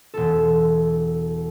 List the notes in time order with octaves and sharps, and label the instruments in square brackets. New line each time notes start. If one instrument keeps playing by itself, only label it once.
[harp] E1 A4